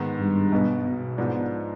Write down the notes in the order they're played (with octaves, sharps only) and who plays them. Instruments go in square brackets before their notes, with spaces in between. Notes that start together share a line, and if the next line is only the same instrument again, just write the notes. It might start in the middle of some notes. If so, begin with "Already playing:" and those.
Already playing: [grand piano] G#2 D#3 G#3 B3
[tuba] G2
[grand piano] B1 B2 B3
[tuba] B2
[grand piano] G#2 F3 B3 D4